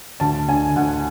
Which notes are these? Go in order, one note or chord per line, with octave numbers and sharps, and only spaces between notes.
D2 A5
D3 G#5
D2 F#5